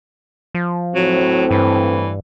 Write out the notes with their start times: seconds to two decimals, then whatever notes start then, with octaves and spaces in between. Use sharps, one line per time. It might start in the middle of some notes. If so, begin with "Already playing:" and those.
0.55 F3
0.95 A2 F#3 C4
1.51 G2 E3